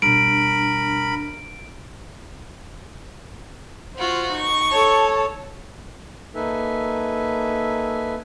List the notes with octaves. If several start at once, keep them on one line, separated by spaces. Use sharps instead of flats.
B2 G3 D4 A#4 B5 D7
F4 F#4 C5
D#4 C#6
A4 C#5 A5
A#3 D#4 A4 B4 E5 G#5